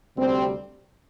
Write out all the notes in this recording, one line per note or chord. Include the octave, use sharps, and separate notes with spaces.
D2 C3 G3 C4